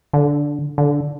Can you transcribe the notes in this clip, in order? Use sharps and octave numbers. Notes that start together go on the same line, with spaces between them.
D3
D3